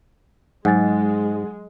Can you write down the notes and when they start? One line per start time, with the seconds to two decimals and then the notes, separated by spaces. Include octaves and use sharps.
0.65 G#2 F#3 G#3 F#5 G#5 A6